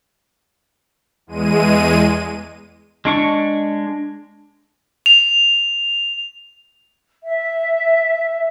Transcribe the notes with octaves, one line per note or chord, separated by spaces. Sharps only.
E2 G#3 D#7
G#3 D4 C#6
F7
E5